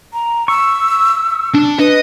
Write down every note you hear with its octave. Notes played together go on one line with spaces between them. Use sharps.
A#5
C#6 E6
D4
B4 D#5